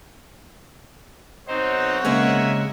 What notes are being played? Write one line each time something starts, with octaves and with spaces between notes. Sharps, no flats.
B1 C4 D#4 C5 C#5 F#5
C#3 G#3 A#3 C4 A#4 E5 G#5